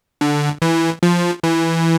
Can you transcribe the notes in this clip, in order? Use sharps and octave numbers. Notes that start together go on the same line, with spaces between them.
D3
E3
F3
E3